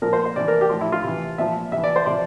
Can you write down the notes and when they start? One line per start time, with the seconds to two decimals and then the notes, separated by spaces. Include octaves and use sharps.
0.02 A#2 F3 A#4
0.13 C5
0.25 C5
0.36 C3 E3 D5
0.48 A#4
0.61 G4
0.69 A2 F3 F4
0.81 E4
0.92 F4
1.04 C3 E3
1.38 A#2 F3 E5
1.72 C3 E5
1.77 E3
1.84 D5
1.96 C5
2.06 C3 F3 D5